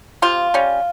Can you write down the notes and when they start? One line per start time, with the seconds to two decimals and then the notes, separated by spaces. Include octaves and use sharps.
0.22 C3 F4
0.54 G3 C#4